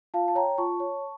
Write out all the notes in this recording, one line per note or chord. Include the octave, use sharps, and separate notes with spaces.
F4 F5 A5
A5
C#5 G5 A#5
F4 A5 C#6
C#5